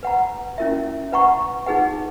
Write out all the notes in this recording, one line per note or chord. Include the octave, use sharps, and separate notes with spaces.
B4 F#5 A#5
C#4 E4 A#4 E5
B4 F#5 A#5 C#6
D#4 G#4 B4 F#5